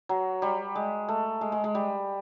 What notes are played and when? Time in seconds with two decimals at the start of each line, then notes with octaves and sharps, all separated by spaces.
0.09 F#3
0.42 G3
0.75 G#3
1.09 A3
1.41 G#3
1.52 G#3
1.64 G#3
1.75 G3